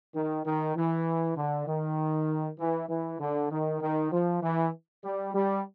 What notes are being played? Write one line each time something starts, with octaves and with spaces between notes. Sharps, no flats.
D#3
D#3
E3
D3
D#3
E3
E3
D3
D#3
D#3
F3
E3
G3
G3